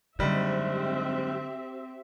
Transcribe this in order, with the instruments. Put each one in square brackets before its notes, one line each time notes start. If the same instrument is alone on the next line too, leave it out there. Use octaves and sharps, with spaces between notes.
[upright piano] F#1 G3 D#4 [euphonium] G#2 [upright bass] D3 [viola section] C4 G4 E5